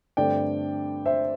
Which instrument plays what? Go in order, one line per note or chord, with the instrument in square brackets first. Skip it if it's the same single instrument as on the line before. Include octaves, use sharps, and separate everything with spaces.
[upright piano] G2 D3 A3 C4 D5 G5
C5 E5